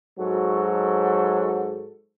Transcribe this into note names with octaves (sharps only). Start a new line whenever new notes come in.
G#2 F#3 F#4 A4